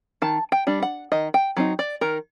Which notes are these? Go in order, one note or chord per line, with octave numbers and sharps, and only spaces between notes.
D#3 A5
G5
G3 D4
F#5
D#3 D#5
G5
F#3 C4 D#4
D5
D#3 A#4